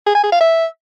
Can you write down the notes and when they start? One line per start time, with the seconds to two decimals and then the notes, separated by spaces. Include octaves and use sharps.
0.06 G#4
0.15 G#5
0.23 G#4
0.32 F5
0.40 E5